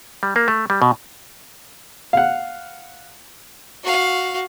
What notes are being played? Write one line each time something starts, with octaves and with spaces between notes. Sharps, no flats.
G3
A#3
A3
G3
B2
F5 F#5
F#4 F5